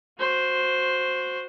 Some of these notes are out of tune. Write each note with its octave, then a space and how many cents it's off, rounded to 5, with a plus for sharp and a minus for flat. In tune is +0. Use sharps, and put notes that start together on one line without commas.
F#4 -20 C5 +0